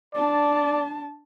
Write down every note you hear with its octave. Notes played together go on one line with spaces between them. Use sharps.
D4 D5 A5